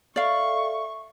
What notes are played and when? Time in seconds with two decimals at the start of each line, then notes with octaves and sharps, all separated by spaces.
0.16 A4 D5 E5 F5 C#6